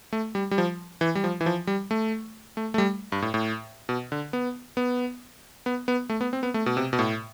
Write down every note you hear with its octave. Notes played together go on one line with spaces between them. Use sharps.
A3
G3
G3
F3
E3
G3
F3
E3
F3
G3
A3
A3
A3
G3
G2
A2
A2
B2
D3
B3
B3
B3
B3
A3
B3
C4
B3
A3
B2
C3
B2
A2